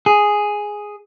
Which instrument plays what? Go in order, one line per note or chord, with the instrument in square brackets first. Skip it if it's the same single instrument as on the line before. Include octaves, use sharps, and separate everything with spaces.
[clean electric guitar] G#4